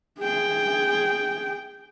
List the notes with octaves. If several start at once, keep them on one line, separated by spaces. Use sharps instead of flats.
G#4 G5